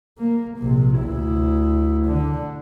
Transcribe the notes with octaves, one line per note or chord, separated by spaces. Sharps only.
A#3
A#1 C3
D2 E4
D3 D4